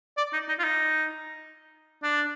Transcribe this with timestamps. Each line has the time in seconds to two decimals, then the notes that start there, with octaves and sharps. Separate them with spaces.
0.17 D5
0.33 D#4
0.49 D#4
0.59 F4
0.64 D#4
2.03 D4